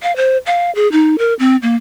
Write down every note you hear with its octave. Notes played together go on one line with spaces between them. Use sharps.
F5
C5
F5
G#4
D#4
A#4
C4
A#3